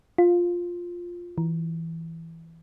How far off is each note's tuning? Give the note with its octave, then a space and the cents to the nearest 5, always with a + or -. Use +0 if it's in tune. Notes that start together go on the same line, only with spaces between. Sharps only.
F4 +5
E3 -5